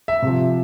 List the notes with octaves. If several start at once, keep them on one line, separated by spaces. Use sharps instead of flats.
E5
C3 F3